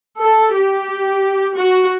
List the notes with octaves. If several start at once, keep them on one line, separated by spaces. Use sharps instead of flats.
A4
G4
F#4